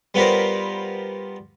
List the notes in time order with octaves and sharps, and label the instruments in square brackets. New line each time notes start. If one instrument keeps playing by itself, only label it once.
[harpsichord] G3 B3 F4 G4 A#4 C5